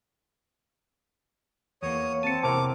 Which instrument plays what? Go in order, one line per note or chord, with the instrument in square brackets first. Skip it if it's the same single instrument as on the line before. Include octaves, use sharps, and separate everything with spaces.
[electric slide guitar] E2 A#3 [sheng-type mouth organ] C#5 D#6
[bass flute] C4 [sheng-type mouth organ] A5 [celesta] C#7 D#7
[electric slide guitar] E2 C3 A#4 [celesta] C5 A5 [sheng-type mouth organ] D6